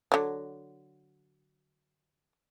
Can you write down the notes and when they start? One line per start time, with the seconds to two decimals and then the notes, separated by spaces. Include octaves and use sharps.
0.12 D3 F#3